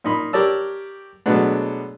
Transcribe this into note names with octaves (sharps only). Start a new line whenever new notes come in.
A#2 D#4 B5
G4 A#4 C#5 D5 A5 E6
B2 F#3 G#3 A3 B3 D4